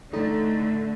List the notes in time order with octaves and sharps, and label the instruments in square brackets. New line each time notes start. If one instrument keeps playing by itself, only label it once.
[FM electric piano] A2 D#4 [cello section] D3 A3